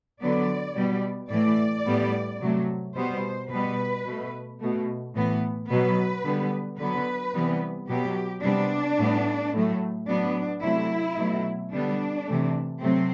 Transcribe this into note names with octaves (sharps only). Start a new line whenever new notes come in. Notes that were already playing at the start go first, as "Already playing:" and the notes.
D3 F#3 B3 D5
B2 G3 B3
A2 E3 A3 D5
A2 G3 B3
C3 F#3 A3
B2 G3 B3 C5
B2 G3 B3 B4
B2 A3
B2 A3
A2 E3 B3
B2 F#3 B3 B4
D3 G3 B3
D3 F#3 B3 B4
C3 E3 G3 B3
B2 F#3 B3 G4
C3 G3 B3 D4
A2 G3 B3
A2 F#3 A3
A2 F#3 B3 D4
C3 F#3 A3 E4
B2 F#3 A3
D3 G3 B3 D4
C3 E3 A3
C3 F#3 A3 C4